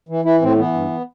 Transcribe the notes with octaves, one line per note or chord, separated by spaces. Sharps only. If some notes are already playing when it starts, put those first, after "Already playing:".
E3
E3 E4
A2 C4
E3 B3
G2